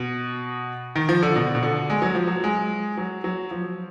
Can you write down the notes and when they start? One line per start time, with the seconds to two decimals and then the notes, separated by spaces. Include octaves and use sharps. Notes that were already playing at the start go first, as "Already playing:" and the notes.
Already playing: B2
0.96 D#3
1.09 F3
1.23 D3
1.36 B2
1.55 B2
1.63 D3
1.90 G#3
2.02 F#3
2.15 F3
2.27 F#3
2.44 G#3
2.97 F#3
3.24 F#3
3.51 F3